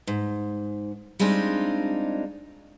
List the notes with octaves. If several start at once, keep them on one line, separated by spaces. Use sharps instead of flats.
G#2
G3 G#3 C4 D4 D#4 F4